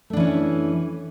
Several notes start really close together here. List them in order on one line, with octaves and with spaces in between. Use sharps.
A3 D4 E3 C#4